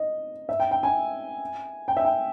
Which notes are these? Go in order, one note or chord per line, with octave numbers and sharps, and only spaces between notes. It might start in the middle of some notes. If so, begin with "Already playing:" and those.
Already playing: D#5
E5
G5
G5
G#5
G5
E5
G5